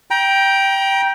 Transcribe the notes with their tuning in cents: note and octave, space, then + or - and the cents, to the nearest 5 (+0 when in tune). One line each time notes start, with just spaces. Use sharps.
G5 +0 A#5 +30